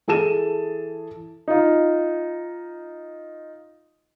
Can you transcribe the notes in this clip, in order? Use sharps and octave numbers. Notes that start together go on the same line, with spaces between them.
E3 G#4 A4 A5 D#7 E7
D#4 F4